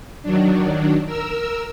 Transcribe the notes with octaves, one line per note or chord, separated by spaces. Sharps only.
D#3 F#3 D4
A#4 E6